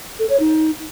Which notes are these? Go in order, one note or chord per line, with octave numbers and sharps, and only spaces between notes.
A4
C#5
D#4